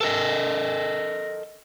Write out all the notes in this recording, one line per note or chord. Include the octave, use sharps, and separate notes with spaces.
A4 A#4 D#5